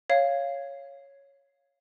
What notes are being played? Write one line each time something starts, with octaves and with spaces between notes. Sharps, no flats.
C#5 F5